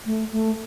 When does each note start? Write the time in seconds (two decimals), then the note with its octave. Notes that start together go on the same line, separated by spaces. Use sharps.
0.06 A3
0.32 A3